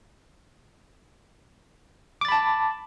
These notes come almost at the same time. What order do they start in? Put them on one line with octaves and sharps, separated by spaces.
D6 A6 B5 A5